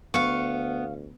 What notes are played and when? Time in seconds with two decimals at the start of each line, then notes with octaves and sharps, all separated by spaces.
0.14 D2 B3 F5 C#6